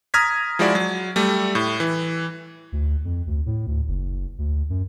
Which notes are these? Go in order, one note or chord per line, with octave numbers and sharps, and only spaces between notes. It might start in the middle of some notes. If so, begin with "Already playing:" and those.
A#5 D#6 F6 G#6 A#6 B6
F3 G#3 E4 F#4 D5
F#3
G3 A3
A2
E3
D2
F2
D2
A2
D2
F#1
D2
F#2